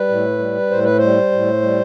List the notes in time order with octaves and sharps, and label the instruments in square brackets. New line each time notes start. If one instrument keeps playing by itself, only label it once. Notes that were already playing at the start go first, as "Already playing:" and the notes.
Already playing: [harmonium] G3 B4
A2
G3
A2 C5
B4
G3 C5
A2
G3